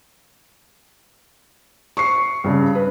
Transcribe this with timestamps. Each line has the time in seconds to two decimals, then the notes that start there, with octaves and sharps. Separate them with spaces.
1.97 C#6 C7
2.44 G2 C#3
2.75 B4